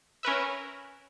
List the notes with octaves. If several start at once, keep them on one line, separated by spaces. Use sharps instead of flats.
C#4 A#4 B4 E5